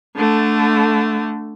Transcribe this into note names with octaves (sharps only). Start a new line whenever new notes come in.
D3 A3